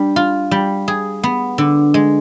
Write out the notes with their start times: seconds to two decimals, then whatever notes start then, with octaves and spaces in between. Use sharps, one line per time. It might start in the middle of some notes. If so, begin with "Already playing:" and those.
Already playing: G3 D4
0.16 F4
0.51 G3
0.88 G#4
1.23 B3
1.58 D3
1.94 G#3